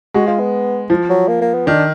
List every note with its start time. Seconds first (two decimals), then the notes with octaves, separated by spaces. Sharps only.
0.14 G#3 F#4
0.27 F4
0.39 B3
0.90 F3
1.09 F#3
1.28 A#3
1.41 A#3
1.54 B3
1.67 D#3 D4